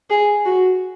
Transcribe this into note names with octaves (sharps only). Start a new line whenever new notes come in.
G#4
F#4